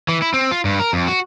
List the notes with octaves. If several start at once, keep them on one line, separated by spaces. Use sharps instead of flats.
E3
E4
C4
F4
G2
A#4
F2
F#4